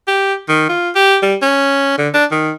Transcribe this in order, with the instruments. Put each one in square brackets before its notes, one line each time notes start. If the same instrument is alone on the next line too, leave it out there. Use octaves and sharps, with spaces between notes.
[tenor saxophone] G4
D#3
F4
G4
G3
C#4
D3
D4
D#3